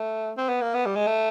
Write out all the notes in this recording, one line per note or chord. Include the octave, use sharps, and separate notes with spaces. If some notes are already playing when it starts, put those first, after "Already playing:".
Already playing: A3
C4
B3
A#3
B3
G3
G#3
A3